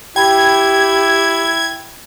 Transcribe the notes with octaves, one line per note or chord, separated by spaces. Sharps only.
E4 G4 G5 B5 G#6